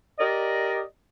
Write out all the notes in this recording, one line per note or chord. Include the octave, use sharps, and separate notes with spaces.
G4 A#4 D5 D#5